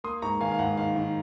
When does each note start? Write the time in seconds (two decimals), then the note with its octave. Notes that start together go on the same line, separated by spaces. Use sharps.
0.04 A#3 C6 D#6
0.22 G#2 A#5 C#6
0.40 D#3 F5 G#5
0.51 F5
0.59 G#2 F#5
0.77 D#3 F5
0.96 D#3